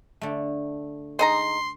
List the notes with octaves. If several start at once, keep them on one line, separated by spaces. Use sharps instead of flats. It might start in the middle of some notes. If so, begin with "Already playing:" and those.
D3 A3
G#3 D#4 A#5 C6